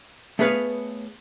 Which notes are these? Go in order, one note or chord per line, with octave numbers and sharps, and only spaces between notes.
A3 B3 G#4 B4 C#5 F5